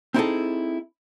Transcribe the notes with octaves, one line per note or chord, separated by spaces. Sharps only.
C4 D#4 E4 F#4 G#4 A4